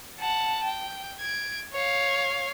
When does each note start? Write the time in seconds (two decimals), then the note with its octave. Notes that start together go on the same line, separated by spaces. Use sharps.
0.20 F#5 A5
0.63 G5
1.19 G#6 D7
1.73 C#5 F5